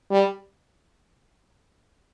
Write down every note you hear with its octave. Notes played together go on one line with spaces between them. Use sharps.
G3